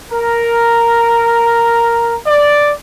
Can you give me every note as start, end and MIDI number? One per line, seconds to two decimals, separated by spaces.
0.11 2.16 70
2.27 2.72 74